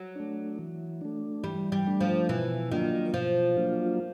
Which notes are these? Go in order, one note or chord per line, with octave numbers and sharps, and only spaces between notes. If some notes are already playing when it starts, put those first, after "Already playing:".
Already playing: F#3
A3 D4
E3
A3 D4
E3 G3
G3
A3 D4
F3
B2 E3
D#3 F#3 A#3 D4 F4
B2 F3
F#3 A#3 D4 F4